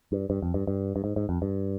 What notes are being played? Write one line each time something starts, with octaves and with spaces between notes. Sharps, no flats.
G2
G2
F2
G2
G2
G2
G#2
G#2
F2
G2